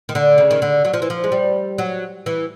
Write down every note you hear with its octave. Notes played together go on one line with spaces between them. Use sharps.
D#3
D3
C#3
D#3
D3
F#3
F3
E3
F3
G#3
G3
F#3
E3